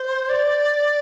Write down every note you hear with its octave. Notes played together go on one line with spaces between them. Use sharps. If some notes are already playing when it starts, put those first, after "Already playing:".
Already playing: C5
D5